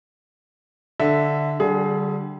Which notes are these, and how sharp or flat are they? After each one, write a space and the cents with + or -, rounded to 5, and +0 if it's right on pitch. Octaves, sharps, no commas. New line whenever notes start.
D3 +0 E5 -5
D3 +0 G3 -25 G#4 +25